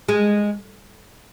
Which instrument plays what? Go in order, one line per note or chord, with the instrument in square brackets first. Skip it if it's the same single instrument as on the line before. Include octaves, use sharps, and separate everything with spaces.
[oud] G#3